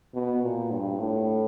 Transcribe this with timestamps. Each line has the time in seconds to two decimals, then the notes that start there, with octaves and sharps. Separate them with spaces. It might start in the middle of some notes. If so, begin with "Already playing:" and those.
0.14 B2
0.43 A#2
0.71 G2
1.00 A2